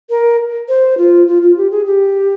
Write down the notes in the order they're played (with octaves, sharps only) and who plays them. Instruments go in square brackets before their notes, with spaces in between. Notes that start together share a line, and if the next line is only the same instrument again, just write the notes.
[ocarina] A#4
C5
F4
F4
F4
G4
G#4
G4